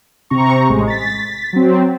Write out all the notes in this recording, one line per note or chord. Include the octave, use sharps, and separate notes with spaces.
C3 C4 A#5 C#6
A1 G#3
A6 B6
F#3 C4